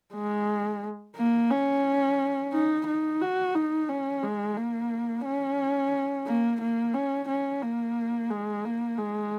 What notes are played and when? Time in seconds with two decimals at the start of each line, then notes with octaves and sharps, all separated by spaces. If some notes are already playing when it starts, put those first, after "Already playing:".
0.15 G#3
1.16 A#3
1.51 C#4
2.53 D#4
2.86 D#4
3.21 F#4
3.55 D#4
3.89 C#4
4.23 G#3
4.57 A#3
5.25 C#4
6.26 A#3
6.61 A#3
6.94 C#4
7.28 C#4
7.62 A#3
8.31 G#3
8.65 A#3
8.98 G#3